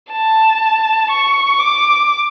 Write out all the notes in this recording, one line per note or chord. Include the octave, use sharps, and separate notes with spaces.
A5
C#6
D6